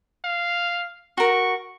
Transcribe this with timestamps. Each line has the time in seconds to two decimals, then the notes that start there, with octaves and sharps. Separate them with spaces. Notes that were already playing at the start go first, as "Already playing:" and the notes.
0.24 F5
1.18 F#4 A#4 C#6